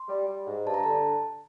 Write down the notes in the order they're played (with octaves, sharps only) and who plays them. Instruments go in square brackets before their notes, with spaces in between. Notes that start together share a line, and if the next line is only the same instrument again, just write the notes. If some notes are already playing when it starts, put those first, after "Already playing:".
Already playing: [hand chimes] C6
[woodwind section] G3
G3
G#2
[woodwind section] G2 [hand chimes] A5
[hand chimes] A#5
[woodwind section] D3 [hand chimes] A5